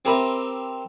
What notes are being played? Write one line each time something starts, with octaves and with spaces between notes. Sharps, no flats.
C4 G4 A#4 B4 E5